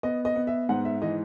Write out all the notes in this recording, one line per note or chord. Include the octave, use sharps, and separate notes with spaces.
B3 D#5
D#5
B3
E5
G#2 F#5
E5
E3 D#5